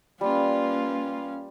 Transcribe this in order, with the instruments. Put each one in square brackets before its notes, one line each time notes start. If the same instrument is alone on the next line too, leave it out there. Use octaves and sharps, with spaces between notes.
[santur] G3 [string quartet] A#3 F4 B4 [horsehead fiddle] C#4 F5